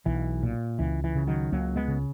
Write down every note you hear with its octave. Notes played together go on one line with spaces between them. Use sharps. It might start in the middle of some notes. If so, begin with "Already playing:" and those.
B1 E3
A#2
C#2 E3
E3
C#3
D#3 F#3
C#2 F#3 A#3
G#3 B3
C#3